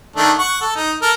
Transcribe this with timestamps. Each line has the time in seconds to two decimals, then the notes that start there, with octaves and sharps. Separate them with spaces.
0.16 D#3 A3 D4
0.39 F#5 C#6
0.61 A4
0.75 D#4
1.02 A4 A#4